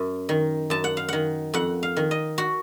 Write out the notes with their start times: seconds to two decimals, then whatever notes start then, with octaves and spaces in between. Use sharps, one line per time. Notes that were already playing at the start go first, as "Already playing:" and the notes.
Already playing: F#2
0.29 D#3
0.70 F#2 A5
0.84 F#5
0.97 F5
1.09 D#3 F#5
1.54 F2 F#5
1.83 F5
1.96 D#3
2.11 D#5
2.38 F#4